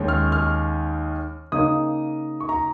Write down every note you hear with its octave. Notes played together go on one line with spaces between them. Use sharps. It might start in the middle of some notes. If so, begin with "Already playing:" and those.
Already playing: D#2 D#3 G#3 C#4
F6
F6
C#3 A#3 D#4 D#6
C#6
A#5